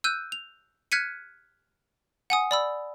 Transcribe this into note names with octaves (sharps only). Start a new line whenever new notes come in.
E6 F#6 G6 D#7
F7
F6 F#6 G#6 B6 C#7 D#7
F#5 G#5 D#6
D5 B5 E6